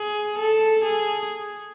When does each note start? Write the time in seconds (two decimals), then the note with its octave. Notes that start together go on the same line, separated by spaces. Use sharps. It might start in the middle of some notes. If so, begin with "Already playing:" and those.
Already playing: G#4
0.38 A4
0.84 G#4